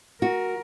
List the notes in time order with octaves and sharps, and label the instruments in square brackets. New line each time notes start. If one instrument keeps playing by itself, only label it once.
[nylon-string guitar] F#4 [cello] A#4